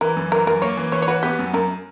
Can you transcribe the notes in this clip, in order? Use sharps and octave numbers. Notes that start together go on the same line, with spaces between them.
E3 A#4
F#2
E3 A#4
F#2 A#4
A#3 C#5
E3
E3 C#5
C#5
F#4 B4
B3 G4
F#2
F#2 A#4